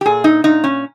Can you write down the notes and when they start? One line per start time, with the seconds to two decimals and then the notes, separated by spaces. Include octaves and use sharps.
0.01 G4
0.06 A#2 G#4
0.24 D#4
0.44 A#2 D#4
0.64 C#4